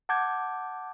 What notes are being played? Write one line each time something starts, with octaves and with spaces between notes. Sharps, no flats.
F#5 A5 D6 G6 G#6